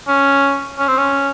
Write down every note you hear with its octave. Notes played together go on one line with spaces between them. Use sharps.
C#4
C#4
C4
C#4